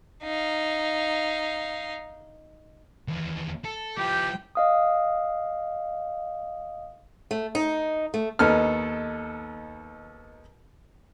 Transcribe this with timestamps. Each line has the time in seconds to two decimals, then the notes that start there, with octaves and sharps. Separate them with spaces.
0.23 D#4 F5
3.08 D#2 E3
3.65 A4
3.97 F3 E4 G4 G5
4.55 D#5 F5 D#6
7.31 A3
7.55 D#4
8.14 A3
8.39 D#2 B3 D#4 A4 F6